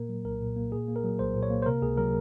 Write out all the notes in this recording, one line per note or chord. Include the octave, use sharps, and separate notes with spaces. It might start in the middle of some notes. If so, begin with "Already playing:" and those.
Already playing: A#2 A#3 A#4
F#3
C2 A#4
A#2
A#3
A#2 G#4
A#3
A#4
F#3
C2 C5
A#2
C#5
A#3
C5
C3 A#4
C#2 G#4
F#3 A#4